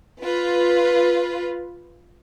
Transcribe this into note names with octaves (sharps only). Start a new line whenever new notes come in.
F4 B4